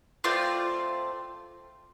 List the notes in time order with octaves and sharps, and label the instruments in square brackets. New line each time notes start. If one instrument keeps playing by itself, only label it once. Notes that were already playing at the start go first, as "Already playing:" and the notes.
[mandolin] A3 C4 F4 D5